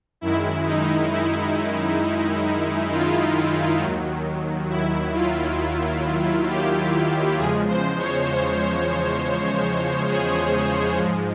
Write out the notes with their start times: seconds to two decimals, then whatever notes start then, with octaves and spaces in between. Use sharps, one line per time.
0.21 F#2 D#3 G#3 E4
0.66 D#4
1.12 E4
2.91 F4
3.80 D#2 D#3 F#3
4.70 E4
5.15 F4
6.49 G4
7.38 E2 C#3 F3 G#3 G#4
7.68 C5
7.98 C#5
8.28 C5
10.08 G#4
10.97 G#2 F3 G#3